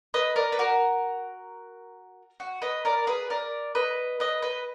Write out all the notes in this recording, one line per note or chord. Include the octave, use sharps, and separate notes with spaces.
B4 D#5
A#4 D5
B4
F#4 A#4
F#4
B4 D#5
A#4 D5
G#4 B4
A#4 D5
B4 D#5
B4 D#5
B4 D#5